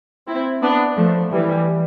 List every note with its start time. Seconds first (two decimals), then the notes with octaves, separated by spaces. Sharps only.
0.27 C4 E4
0.62 B3 D4
0.97 F3 A3
1.31 E3 G3